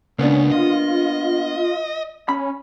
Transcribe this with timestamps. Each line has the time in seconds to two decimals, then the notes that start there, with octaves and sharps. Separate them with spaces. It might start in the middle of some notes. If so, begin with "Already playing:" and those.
0.19 C#2 A#3 B3 C#4 D4
0.51 F4 D#5
2.29 C#4 B5